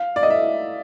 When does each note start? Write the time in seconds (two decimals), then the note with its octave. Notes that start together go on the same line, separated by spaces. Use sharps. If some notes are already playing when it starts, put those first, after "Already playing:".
Already playing: F5
0.16 D5
0.23 D#5
0.30 E5